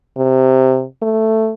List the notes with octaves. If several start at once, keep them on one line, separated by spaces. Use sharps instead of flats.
C3
A3